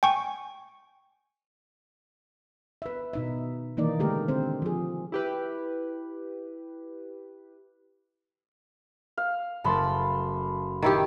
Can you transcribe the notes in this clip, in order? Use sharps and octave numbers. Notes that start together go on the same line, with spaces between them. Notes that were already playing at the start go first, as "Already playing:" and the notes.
G5 G#5 C#6
B4 E5
B2 D#4 E5
D#3 E3 A#3 D#4 D5
D3 G#3 A3 G4 A#4
D3 C4 C5
F3 G#4
E4 G4 B4
F5
F#1 A3 A5 B5 C6 A6
D#3 E4 G4